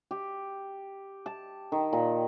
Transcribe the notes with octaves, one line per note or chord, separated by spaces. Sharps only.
G4
A5
D#3
A#2